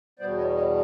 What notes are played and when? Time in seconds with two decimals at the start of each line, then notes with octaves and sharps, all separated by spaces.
0.19 E2 B2 G3 B3 C5 D5
0.37 C#5 D#5
0.55 C#5 D#5